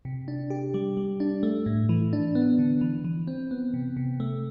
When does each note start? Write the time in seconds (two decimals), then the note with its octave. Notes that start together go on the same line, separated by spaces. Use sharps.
0.05 C3
0.28 D4
0.50 G4
0.74 G3
0.97 G3
1.20 D4
1.43 A3
1.66 A2
1.89 E3
2.13 D4
2.35 B3
2.59 D3
2.81 E3
3.04 E3
3.27 C4
3.51 B3
3.74 C3
3.97 C3
4.20 A3